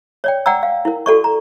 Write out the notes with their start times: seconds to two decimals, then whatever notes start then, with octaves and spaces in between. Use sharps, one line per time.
0.24 C#5 D5 G5
0.46 D5 F#5 G5 A#5 E6
0.63 F5
0.85 E4 A#4
1.06 F#4 A4 D5 C#6
1.24 A#5